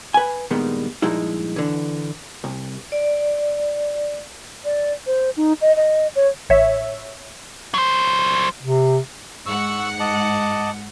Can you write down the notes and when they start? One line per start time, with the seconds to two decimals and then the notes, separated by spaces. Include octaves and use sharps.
0.14 B4 G#5
0.50 G2 A#2 D#3 G3 G#3 B3
1.02 G2 A#2 F3 G#3 D#4 E4
1.56 D3 E3
2.44 C2
2.92 D5
4.65 D5
5.07 C5
5.37 D#4
5.61 D#5
5.76 D#5
6.16 C#5
6.49 A1 C#5 E5
7.74 F#3 C5
8.63 C3
9.46 G#2 F#5 C#6 E6
10.00 D#5 A5 D6